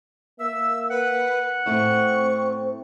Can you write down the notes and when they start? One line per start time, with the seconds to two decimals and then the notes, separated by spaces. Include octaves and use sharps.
0.40 A#3 E5 E6
0.90 B4 F#5
1.66 A2 A3 C4 E4 C#6